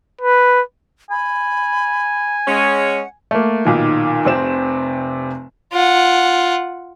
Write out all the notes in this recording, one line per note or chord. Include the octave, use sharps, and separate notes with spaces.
B4
G#5 B5
G#3 C#4 F#5
A3 A#3
B1 A#2 D#3
F1 C3 C4 E7
F4 F#5